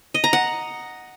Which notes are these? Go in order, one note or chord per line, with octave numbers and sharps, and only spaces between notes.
D#5
A#5
F#5